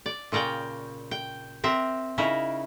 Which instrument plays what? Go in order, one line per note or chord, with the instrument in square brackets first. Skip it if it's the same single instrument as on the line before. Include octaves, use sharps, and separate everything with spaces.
[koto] D5
A#2 C#3 A#4 D5 G5
G5
C4 A#4 E5
C#3 D#4 E4 A#4